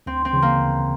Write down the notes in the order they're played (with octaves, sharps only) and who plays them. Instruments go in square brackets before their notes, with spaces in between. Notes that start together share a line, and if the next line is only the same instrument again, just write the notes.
[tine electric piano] D2 [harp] C4
[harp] C4
[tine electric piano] C#3 E3
[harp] A#3
[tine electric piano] D2